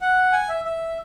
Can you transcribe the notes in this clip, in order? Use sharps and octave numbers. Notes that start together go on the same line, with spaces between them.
F#5
G#5
E5
E5